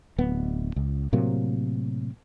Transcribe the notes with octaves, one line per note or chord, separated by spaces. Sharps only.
D1 B3
C#2
A2 C3 F#3 A#3